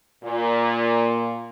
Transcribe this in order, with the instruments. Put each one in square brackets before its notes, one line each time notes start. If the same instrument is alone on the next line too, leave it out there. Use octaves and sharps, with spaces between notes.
[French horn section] A#2